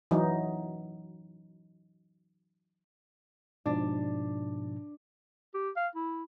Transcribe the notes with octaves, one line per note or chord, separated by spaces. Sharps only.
E3 F#3 D#4
G#2 B2 F3 D4
G4
F5
E4